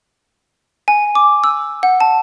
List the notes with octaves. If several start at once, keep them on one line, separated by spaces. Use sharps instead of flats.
G#5
D6
E6
F#5
A5